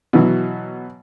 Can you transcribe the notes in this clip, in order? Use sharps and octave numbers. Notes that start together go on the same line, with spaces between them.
B2 E3 F#3